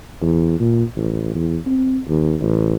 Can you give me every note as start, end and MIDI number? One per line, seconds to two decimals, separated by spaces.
0.21 0.59 40
0.60 0.83 46
0.96 1.33 33
1.35 1.58 40
1.66 1.99 60
2.09 2.36 39
2.42 2.76 33